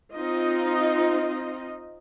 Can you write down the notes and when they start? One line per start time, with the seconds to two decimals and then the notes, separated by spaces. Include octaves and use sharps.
0.14 C4 D#4 F4 D#5